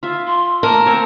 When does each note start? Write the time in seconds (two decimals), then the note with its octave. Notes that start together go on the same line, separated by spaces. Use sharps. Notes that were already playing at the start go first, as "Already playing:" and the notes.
0.03 F4 E5
0.27 C6
0.63 A3 A#3 A#4 A5
0.86 C4 C#5